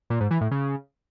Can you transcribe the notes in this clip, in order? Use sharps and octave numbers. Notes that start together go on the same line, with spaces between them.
A#2
G#2
E3
A2
C#3